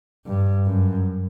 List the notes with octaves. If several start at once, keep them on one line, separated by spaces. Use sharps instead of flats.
G2
F#2